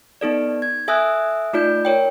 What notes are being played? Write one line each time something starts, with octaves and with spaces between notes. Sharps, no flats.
B3 D#4 A4 D5
G#6
A4 E5 G#5 D#6 E6 F#6
A3 D#4 F4 D5 G6
A#4 C#5 G5